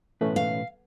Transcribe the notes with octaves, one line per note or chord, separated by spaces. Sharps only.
B1 A2 E3 A3 C#4 B4
F5